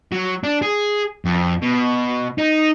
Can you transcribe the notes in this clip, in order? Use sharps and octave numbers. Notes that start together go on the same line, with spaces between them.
F#3
D4
G#4
F2
B2
D#4